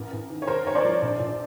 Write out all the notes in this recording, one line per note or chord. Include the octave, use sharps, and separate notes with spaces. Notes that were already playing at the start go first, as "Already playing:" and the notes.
Already playing: A1 A#4
A1
D#3
C#5
D#2 A#4 C5
D#2 C#5
C5 D5
F3
A#1
A#1